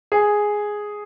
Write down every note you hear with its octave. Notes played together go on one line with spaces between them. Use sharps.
G#4